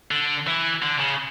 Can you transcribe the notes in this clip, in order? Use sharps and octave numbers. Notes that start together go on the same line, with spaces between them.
D3
E3
D3
C#3